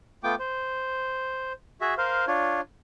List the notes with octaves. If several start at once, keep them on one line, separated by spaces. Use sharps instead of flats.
A3 B3 F4 G5 D6
C5
F#4 G#4 E5
A#4 C5 F5
D4 F4 C#5